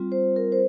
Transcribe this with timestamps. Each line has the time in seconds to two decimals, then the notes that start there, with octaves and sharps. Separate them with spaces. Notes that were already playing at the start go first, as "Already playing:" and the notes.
Already playing: G3 C4 F4
0.12 C5
0.36 A#4
0.52 C5